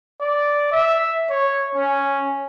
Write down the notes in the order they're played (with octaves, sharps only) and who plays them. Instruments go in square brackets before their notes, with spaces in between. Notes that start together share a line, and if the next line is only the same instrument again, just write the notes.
[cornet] D5
E5
C#5
C#4